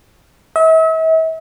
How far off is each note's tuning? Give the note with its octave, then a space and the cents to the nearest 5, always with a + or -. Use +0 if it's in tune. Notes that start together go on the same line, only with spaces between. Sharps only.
E5 -40